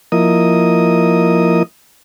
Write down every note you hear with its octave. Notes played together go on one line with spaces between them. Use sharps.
F3 A#3 E4 A#4 D#5 D#6